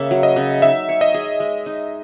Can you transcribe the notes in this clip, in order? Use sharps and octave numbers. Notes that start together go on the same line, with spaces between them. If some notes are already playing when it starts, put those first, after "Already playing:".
Already playing: C#3 A#3 E5
F#3
D#5
C#3
D#4 E5
C#5
D#5
G#4
G#3
D#4